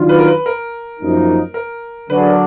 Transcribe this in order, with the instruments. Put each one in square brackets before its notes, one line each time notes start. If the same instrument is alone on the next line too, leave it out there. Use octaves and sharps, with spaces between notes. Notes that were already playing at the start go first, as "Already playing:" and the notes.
Already playing: [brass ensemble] D#3 F#3 D4 F4
[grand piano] B4
A#4
B4
A#4
[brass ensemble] F#2 F3 A#3 D#4
[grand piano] A#4
[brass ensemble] D3 F#3 D4 [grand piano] B4
[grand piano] G#4
A#4